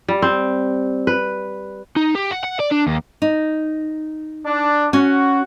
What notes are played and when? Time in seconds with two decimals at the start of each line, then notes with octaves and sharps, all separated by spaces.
0.08 G3
0.22 C4
1.07 B4
1.96 D#4
2.15 G4
2.32 F#5
2.44 F#5
2.60 D5
2.72 D4
2.87 D#2
3.22 D#4
4.46 D4
4.93 C#4 F#4